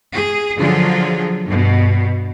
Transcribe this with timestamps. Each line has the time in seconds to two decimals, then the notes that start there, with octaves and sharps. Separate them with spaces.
0.13 G#4
0.56 D3 F3 F#3 F4 G#4
1.45 G2 B2